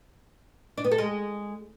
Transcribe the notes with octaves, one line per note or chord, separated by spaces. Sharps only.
D4
B3
A4
G#3